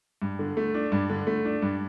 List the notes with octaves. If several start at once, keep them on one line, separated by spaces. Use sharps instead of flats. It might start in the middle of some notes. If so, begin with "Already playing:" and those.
G2
D3
A3
D4
G2
D3
A3
D4
G2